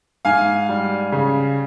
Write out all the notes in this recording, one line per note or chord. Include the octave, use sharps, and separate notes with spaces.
G#2 F5 G#5
G3
C#3